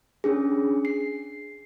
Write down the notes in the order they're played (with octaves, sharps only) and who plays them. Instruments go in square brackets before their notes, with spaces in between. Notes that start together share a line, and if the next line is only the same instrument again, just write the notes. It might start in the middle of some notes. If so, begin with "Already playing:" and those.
[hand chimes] C#4 D4 G#4
C7